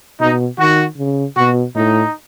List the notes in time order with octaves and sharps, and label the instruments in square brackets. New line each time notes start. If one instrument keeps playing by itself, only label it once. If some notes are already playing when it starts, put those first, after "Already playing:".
[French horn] B2 [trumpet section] D#4
[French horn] D#3 [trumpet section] F#4
[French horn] C#3
[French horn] B2 [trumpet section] F#4
[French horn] A2 [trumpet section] D#4